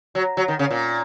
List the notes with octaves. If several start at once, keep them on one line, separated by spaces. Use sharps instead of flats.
F#3
F#3
D#3
C#3
A#2